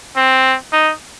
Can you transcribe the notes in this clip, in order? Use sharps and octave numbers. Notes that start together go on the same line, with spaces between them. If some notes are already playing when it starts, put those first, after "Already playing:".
C4
D#4